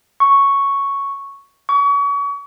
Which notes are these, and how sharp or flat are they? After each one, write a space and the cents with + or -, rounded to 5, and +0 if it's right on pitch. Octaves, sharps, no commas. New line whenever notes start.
C#6 +0
C#6 +35